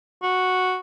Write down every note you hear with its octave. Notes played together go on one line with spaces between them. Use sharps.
F#4